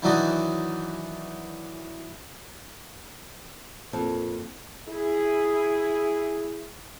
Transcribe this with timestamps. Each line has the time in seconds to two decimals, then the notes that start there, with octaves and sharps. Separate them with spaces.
0.02 D#3 E3 F#3 D4 D#4 F#4
3.93 F2 A#2
4.88 E4 G#4